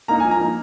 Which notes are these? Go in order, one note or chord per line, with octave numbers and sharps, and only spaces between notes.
A#3 D#4 A#5
F3 G#5
A#5
A#3 D#4